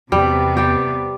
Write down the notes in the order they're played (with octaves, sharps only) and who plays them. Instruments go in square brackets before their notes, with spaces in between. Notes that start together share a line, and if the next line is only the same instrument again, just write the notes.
[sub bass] E2 [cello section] C3 B3 [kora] G3
[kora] G3 G4